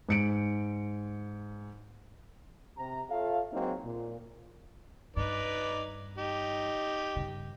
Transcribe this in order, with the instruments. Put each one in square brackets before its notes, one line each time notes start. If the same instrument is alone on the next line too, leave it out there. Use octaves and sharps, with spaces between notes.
[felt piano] G#2 C#7 D7
[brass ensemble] C3 A#5
F4 A4 C#5 E5 F5
F#3 G#3 A#3 C4 D#4
A#2
[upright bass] G2 [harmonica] D#4 B4 D5
[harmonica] D#4 G4
[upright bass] G2 C#3